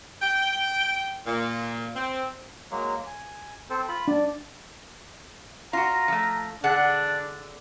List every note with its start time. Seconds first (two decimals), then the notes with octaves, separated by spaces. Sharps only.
0.22 G5
1.26 A#2
1.95 C4
2.71 F#3 G#3 A#3
3.06 G#5
3.70 C4 A4 C5
3.88 F4 B5
4.08 D4 D5
5.73 F4 F#4 A#5
6.08 F3 A3
6.64 D3 D4 G#4 F#5